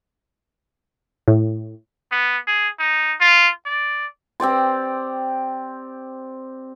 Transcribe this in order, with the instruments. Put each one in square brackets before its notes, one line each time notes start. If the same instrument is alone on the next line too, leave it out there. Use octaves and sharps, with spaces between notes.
[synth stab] A2
[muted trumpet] B3
G#4
D#4
F4
D5
[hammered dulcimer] C4 G4 D5 C6